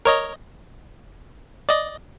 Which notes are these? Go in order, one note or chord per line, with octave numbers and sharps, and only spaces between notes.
A#4 C#5 D#5
D5 D#5